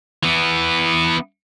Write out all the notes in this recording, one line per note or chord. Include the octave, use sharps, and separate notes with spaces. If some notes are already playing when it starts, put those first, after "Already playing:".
E3 B3